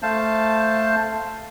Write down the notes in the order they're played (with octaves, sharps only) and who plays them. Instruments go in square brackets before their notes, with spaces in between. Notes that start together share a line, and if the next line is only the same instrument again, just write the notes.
[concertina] A3 C5 F5 A5